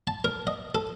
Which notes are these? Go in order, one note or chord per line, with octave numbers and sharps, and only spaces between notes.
A5
A#4
D#5
A4